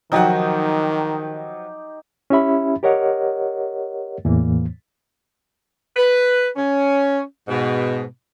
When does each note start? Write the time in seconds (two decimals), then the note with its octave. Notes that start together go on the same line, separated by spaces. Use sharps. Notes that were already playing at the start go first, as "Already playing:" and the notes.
0.12 D#3 F3 F#3 D#4 F#4 G4
2.30 C#4 E4 G4 E5 B5
2.83 G4 A#4 C#5 D#5 F#5
4.25 E2 A2 E3 A#3
5.97 B4
6.56 C#4
7.48 G#2 B2